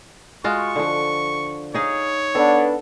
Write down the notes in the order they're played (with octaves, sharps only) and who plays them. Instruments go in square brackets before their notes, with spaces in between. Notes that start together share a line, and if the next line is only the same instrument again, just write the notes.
[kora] G#3 F4 F#4 [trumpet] C#6
[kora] D3 F3
[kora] D#4 G#4 F5 [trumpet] C#5
[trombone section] B3 D4 [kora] A4